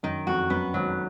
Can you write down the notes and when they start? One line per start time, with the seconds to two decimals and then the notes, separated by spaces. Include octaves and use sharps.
0.03 F#2 D#3
0.27 F2 F#4
0.50 F#2 B3
0.74 G#1 G#2 F#3